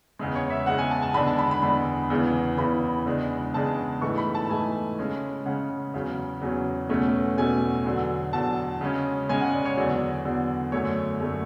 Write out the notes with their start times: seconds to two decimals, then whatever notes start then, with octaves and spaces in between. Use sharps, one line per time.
0.19 E2 C#3 G#3
0.35 C#5
0.50 E5
0.66 E2 C#3 G#3 F#5
0.78 G#5
0.91 A5
1.02 A5
1.14 E2 D3 G#3 D4 B5
1.27 A5
1.39 B5
1.51 B5
1.62 E2 D3 G#3 D4 B5
2.10 E2 C#3 E3
2.58 E2 C#3 E3 B5
3.06 E2 C#3 G#3 D4
3.54 E2 C#3 G#3 D4 A5
4.01 G#2 E3 A3 C#6
4.18 B5
4.35 A5
4.45 A5
4.49 G#2 E3 A3 G#5
4.98 C#3 G#3 C#4
5.45 C#3 G#3 C#4 F#5
5.94 E2 C#3 F#3 C#4
6.41 E2 C#3 F#3 C#4
6.89 E2 B2 A3 C#4
7.37 E2 B2 A3 C#4 G#5
7.85 E2 D3 F#3
8.33 E2 D3 F#3 A5
8.81 C#3 G#3 C#4
9.29 C#3 G#3 C#4 G#5
9.41 F#5
9.53 D5
9.65 C#5
9.77 E2 D3 F#3 D5
10.25 E2 D3 F#3
10.72 F#2 D3 A3 C#5
11.20 F#2 D3 A3